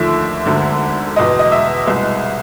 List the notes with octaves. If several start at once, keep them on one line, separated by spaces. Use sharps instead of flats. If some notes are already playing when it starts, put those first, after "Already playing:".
Already playing: D#2 D3 F3 A3 E5
E1 D2 D3
E2 B2 G#3 D#5
D#5
E5
C2 B2 G#3